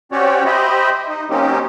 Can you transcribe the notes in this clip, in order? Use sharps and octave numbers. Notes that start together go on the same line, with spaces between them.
C4 C#4 F#4 G4 C#5 D5
G4 C5 D#5 E5 B5
D#4
F#3 A#3 C4 C#4 D#4 G4